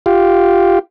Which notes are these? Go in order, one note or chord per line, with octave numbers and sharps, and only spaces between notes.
F4 G4